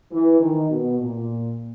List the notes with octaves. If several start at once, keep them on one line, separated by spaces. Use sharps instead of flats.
E3
D#3
B2
A#2